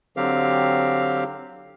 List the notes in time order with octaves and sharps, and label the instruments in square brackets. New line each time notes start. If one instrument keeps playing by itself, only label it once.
[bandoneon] D3 F#3 C4 G4 F5